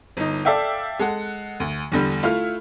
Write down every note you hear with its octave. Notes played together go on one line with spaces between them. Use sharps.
G1 D#4
A4 D5 E5 F5 G5
G#3 A4 F#5
D2
E2 D3 G3
A3 E4 F4 F6